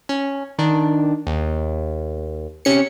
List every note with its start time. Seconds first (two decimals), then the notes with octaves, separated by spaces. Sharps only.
0.09 C#4
0.59 D#3 D4
1.27 D#2
2.65 C3 C#4 C#7